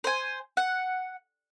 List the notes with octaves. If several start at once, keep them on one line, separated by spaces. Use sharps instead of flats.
C5 G#5
F#5